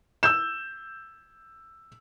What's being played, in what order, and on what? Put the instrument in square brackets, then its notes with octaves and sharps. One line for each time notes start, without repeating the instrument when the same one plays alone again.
[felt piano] E6 G6 E7